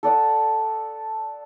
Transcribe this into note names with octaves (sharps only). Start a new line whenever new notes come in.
A4 D5 F#5 D#6